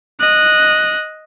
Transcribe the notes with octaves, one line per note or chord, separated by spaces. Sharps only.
D#5 F#6